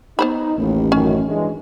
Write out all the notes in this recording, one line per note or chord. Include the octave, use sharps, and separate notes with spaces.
B3 D#4 C5 B5
A1 D#2
F#2 D#3 C#4
G2 E3 G#3